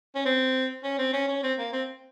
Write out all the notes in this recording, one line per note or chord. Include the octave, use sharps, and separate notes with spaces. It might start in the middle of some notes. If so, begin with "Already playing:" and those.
C#4
C4
C#4
C4
C#4
C#4
C4
A#3
C4